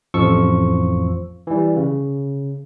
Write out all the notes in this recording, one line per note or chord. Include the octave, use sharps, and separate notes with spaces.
A1 F2 F3 C#6 E6
E3 G3
C#3